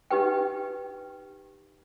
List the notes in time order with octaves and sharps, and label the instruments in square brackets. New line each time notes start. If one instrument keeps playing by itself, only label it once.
[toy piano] D#4 G4 B4 G5